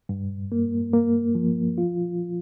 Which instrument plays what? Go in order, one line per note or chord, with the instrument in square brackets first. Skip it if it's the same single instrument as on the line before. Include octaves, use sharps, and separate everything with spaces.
[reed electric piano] G2
A#3
A#3
F3
F4